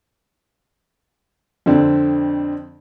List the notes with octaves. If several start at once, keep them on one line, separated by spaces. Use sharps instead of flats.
F2 D3 C4 D4